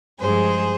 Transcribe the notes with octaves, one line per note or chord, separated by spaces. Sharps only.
G2 F3 G#3 G#4 C5